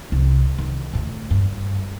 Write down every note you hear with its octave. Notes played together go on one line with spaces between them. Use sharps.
C2
D#3
D2 A2
G2